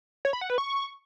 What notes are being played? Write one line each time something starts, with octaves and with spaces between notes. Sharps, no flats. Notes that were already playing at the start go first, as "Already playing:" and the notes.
C#5
B5
F#5
B4
C#6